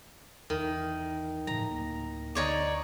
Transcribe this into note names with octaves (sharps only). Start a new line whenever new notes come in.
E2 D#3
A2 C#3 F3 A#5
D1 A#3
D2 D3 D#3 D#4 C#5 D5